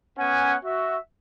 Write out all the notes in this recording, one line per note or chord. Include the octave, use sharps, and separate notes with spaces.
B3 C#4 F#5 G#5
F#4 E5